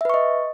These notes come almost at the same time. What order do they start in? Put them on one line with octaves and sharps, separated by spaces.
E5 B4 C#6 D#5